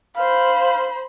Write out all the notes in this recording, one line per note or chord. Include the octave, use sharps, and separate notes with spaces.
C5 F5 B5